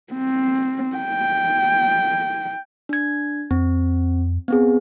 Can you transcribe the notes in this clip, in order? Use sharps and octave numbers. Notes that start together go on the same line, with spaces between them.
C4
G5
D4 G#6
F2 C4
B3 C4 G#4